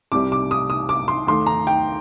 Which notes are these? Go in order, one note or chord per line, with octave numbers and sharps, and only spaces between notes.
C2 C3 G3 D6
D6
D#6
D#6
D6
C6
D#2 D#3 A3 C6
A#5
G5